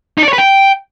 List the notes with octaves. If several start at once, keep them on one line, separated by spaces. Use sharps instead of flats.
D#4
D5
C#5
B4
G5